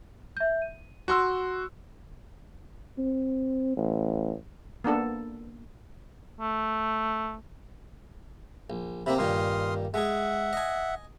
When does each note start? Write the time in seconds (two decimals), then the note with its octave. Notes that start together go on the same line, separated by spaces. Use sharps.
0.37 E5 G6
0.62 D#7
1.08 F#4 C6 E6
2.98 C4
3.77 A1
4.84 A#3 B3 D4 A4
6.40 A3
8.70 A#1
9.06 C3 A#3 C4 E5 B5
9.18 G2 A#2 D#3 C6 D#6 F6
9.94 G#3 G#4 E5 F#5
10.53 D#5 G#5